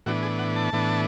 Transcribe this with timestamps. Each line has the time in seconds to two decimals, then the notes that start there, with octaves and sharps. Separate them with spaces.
0.06 A2 E3 B3 D4 F#4
0.23 G#4
0.39 F#5
0.56 A5
0.73 A2 E3 B3 D4